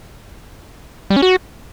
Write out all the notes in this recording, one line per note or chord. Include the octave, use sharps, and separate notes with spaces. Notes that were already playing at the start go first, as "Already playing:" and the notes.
G3
C#4
F#4